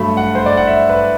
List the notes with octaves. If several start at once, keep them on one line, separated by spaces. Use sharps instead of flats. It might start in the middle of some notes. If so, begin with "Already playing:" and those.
Already playing: G2 F#3 A3 B5
F#5
C5
D5
F#5
E5
B4